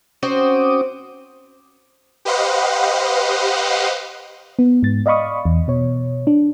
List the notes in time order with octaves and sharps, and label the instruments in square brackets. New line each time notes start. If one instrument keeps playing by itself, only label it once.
[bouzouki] C4 F#4 C5 [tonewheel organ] C#4 D6 D#6
[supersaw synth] G4 B4 C5 D#5 F5 F#5
[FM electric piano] B3
G#2 A6
D5 D#5 F5 B5 C#6 D#6
E2
B2 C#5
D4